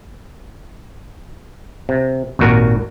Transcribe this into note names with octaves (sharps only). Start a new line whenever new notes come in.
C3
G#1 D#2 A#2 F#4 A#4